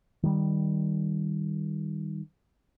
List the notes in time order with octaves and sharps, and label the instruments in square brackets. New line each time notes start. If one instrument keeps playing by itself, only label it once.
[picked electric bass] D#3 G3